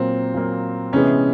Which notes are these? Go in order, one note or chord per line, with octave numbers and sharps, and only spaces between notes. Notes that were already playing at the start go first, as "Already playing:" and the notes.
Already playing: A#2 F#3 A#3 C4
A#2 F#3 A#3
C3 E3 G#3 B3 C#4